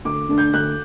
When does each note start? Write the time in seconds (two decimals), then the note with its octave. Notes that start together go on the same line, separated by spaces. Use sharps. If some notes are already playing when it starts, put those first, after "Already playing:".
0.05 D2 D6
0.29 D3 A3 D4
0.38 G6
0.53 D2 F#6